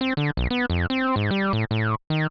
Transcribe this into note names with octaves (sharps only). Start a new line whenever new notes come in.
C4
D3
B1
B3
F2
C4
G#2
G3
A2
A2
D#3